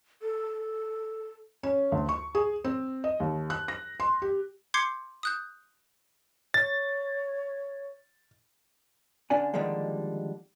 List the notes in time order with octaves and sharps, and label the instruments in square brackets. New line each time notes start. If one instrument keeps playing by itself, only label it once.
[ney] A4
[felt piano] C#4
D2
C#6
G#4
C4
D#5
D#2
F#6
A#6
C6
G4
[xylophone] C6 D6 G6 G#6 C7 C#7
D#6 F#6 G6
[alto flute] C#5 [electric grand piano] A6
[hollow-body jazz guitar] D3 C#4 D4 D5 G#5
D3 D#3 F3 G3 G#3 A#3